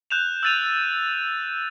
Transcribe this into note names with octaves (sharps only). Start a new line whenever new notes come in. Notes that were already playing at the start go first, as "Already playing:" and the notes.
F#6 G6 E7 F7
E6 F#6 A6 D#7 F7